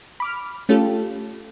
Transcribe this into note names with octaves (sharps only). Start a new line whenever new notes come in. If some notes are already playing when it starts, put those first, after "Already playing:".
B5 D6 F6
A3 C#4 F4 G4 A4